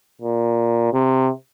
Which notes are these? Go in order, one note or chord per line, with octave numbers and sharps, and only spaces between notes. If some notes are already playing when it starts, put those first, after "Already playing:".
A#2
C3